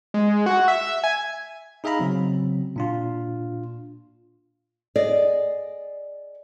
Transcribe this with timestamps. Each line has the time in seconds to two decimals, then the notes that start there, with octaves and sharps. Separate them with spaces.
0.14 G#3
0.46 F#4
0.68 E5
1.04 G#5
1.84 D#4 G#4 E5 F5 A#5 B5
1.99 C#3 F#3 C4
2.76 A#2 D4 F4
4.96 G#4 D5 D#5